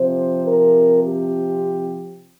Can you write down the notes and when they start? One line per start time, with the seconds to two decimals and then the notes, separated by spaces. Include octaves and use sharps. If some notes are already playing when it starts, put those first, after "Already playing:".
Already playing: C3 F3 C4 C5
0.46 A#4
1.02 G4